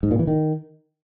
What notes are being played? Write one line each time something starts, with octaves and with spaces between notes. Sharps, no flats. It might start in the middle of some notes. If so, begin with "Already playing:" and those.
G#2
A#2
E3
D#3